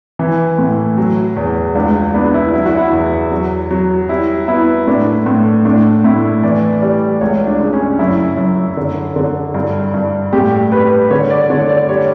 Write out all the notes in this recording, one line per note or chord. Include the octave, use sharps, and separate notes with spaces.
E3 E4
A2
F#3
E2
C#2 D4
B3 D4
E4
F#3 E4
F#4
E4
E2
F#3
F#3
G3 E4
B3 E4
A2 D4
A2
A2 D4
A2 E4
E3 D5
G3 D5
C#2 C#5
D4
C#3
C#4
F#2 E4
F#2
D3
D3
G2
G2
A2 G4
G3 B4
D3 C#5
D5
D3 C#5
D5
G3 C#5